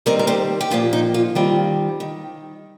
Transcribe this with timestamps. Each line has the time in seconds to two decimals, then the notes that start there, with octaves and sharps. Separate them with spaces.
0.06 D#3 G3 C4 A#4 D#5
0.19 A#4
0.27 G4 C5
0.61 G4
0.71 A#2 F3 A#3 F4
0.93 D#4
1.14 F4
1.35 D#3 G3 C4 F4
2.00 D#3